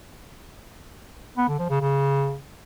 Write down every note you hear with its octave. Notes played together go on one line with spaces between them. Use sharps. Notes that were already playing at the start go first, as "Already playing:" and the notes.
B3
D3
F3
C#3
C#3